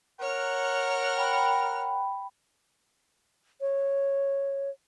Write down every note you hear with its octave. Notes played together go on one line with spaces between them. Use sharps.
A#4 C#5 F#5 F6
G5 B5
C#5